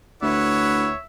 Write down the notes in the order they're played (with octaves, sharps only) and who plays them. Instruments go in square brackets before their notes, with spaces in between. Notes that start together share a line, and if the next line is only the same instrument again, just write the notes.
[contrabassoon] D2 [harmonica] E4 B4 F#5 [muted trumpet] C#5 [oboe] E5